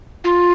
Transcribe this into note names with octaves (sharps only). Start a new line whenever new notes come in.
F4